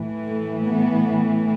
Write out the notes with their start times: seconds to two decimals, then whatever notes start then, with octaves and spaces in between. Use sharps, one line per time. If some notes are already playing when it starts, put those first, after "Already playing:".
Already playing: A2 E3
0.28 A3
0.67 B3